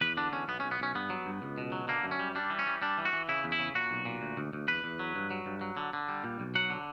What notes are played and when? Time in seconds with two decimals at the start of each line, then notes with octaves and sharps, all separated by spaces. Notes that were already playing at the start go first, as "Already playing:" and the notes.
0.01 E2 B4
0.17 D3 D4
0.32 E2 C#4
0.48 B1 B3
0.60 C#4
0.64 B1
0.71 B3
0.80 B1 C#4
0.95 G2 B3
1.10 F#3
1.26 G2
1.42 C#2
1.58 B2
1.72 F#3
1.88 D3 A#3
2.04 F#2
2.11 C#4
2.19 G3
2.35 G3 D4
2.50 E3
2.59 C#4
2.67 G3
2.82 G3 D4
2.98 E3
3.05 F#4
3.13 E3
3.29 C#3 E4
3.44 E2
3.52 E4
3.59 C#3
3.75 A#2 F#4
3.91 B1
4.05 A#2
4.22 D2
4.37 D2
4.53 D2
4.68 E2 B4
4.84 E2
4.99 F#3
5.16 G2
5.31 F#3
5.46 G2
5.61 F#3
5.77 D3
5.93 D3
6.09 G3
6.24 A#2
6.40 B1
6.55 F#3 F#5
6.70 D3